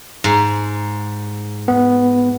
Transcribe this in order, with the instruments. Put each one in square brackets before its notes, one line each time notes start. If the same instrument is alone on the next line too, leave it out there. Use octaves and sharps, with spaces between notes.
[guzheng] G#2
[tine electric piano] B3